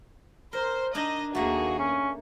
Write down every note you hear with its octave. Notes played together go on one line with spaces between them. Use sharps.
A#4 C5
D4 D#4 D#5 G#5
D#2 A3 A#3 F#4 G#4
C#4